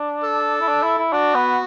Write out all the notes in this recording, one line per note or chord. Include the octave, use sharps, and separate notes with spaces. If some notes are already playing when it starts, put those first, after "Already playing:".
Already playing: D4
A4
E4
D4
E4
E4
D4 F#4
B3